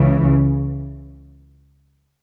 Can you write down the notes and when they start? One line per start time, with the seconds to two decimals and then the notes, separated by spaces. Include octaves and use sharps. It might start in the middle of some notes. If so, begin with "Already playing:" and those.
Already playing: C#2 C#3 E3